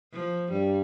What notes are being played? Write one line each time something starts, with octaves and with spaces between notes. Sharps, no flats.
F3
G2 G3